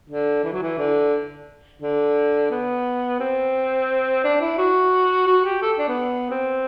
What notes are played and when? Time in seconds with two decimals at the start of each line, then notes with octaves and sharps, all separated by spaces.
0.09 D3
0.44 E3
0.53 F#3
0.63 E3
0.78 D3
1.82 D3
2.51 B3
3.20 C4
4.24 D4
4.41 E4
4.58 F#4
5.27 F#4
5.44 G4
5.62 A4
5.79 D4
5.88 B3
6.30 C4